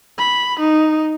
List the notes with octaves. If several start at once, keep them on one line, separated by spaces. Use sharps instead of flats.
B5
D#4